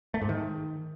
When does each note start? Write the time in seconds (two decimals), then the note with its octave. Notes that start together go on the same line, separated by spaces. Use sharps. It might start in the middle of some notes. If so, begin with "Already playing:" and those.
0.14 A3
0.22 G#2
0.29 D#3